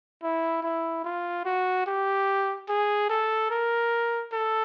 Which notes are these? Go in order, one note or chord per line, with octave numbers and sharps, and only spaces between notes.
E4
E4
F4
F#4
G4
G#4
A4
A#4
A4